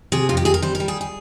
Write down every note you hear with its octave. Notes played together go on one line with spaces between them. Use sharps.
C3 G#4
F2 F4
G4
C3 G#4
A#4
G3 C5
A#4
G3
G#4
G#4